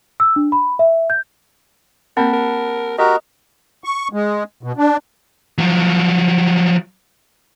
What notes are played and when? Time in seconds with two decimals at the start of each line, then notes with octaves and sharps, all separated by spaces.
0.20 E6
0.36 D4
0.52 B5
0.79 E5
1.10 G6
2.17 A#3 C4 A#4 F#5 A5 B5
2.33 A#4
2.98 F#4 G4 A#4 D#5
3.84 C#6
4.13 G#3
4.63 B2
4.77 D4
5.58 F3 F#3